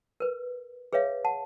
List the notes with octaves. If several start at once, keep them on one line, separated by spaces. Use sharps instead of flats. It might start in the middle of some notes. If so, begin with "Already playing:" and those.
A#4 B4
G#4 B4 C#5 E5 F5
F#5 A5